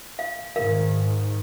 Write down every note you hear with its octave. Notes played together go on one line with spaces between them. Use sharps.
F5
G#2 D#3 A#4 F5